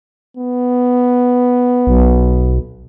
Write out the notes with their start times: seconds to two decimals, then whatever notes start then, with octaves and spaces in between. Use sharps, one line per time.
0.37 B3
1.87 B1